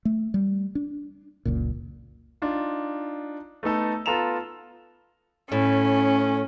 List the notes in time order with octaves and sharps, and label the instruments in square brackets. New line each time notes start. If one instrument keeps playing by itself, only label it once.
[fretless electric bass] A3
G3
D4
F#1 C#2 A#2
[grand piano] D4 D#4 F4
A3 B3 D#4 A4
B3 F4 A4 A#5 E7 F7
[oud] A2 [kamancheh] C#4